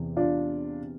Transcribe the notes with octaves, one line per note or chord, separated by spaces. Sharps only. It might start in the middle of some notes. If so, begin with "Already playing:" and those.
Already playing: E2 C3 E3
D4 F4